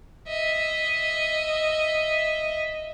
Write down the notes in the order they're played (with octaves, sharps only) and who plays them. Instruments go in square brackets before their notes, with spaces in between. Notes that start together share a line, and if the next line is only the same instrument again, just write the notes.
[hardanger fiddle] D#5 E5